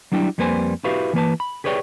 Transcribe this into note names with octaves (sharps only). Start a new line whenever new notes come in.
F#3 G3 D4 E4 G5
F2 G3 A#3 B4 C5 G#5
E4 F#4 G4 B4 F5
E3 A#3 B4 A5
B5
G4 G#4 B4 C#5 D5 G5